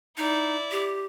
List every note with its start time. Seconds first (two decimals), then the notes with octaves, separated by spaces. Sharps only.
0.17 D#4 E4 D5
0.71 G4